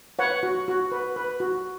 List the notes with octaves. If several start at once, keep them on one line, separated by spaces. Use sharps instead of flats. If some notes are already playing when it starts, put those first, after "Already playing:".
B4 C#5 F#5
F#4
F#4
B4
B4
F#4